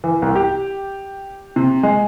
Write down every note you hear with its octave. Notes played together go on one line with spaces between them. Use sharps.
E3
C2
G4
C3
G#3